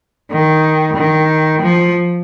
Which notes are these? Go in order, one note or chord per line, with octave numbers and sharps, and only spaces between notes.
D#3
D#3
F3